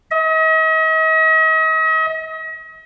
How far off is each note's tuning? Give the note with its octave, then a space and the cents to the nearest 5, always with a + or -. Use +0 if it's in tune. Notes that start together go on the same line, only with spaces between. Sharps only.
D#5 +40